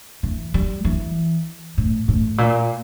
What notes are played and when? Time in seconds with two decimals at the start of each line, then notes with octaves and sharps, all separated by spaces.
0.23 E3
0.54 G3
0.85 E3
1.78 A2
2.08 A2
2.38 A#2